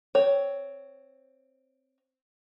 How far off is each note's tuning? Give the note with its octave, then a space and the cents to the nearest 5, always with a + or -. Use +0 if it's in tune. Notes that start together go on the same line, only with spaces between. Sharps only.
C4 +0 C#5 +10